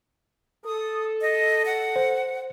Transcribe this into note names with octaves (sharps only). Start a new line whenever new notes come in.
A4 D#6
D#5
F#5
C5